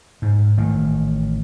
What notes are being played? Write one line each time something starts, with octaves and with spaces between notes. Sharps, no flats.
G#2
A1 D#3